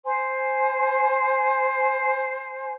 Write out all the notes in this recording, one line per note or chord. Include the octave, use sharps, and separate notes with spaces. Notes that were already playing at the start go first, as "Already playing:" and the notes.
C5 G#5